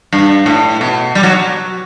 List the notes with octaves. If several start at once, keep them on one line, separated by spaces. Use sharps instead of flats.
G2
A2
B2
G3
F#3